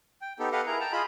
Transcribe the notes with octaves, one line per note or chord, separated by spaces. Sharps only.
G5
B3 D#4 G4 A4
G4 A4 B4 D#5 F5 F#5
E4 G#4 A#4 A#5
G5 A5 A#5
F4 G#4 D#5 B5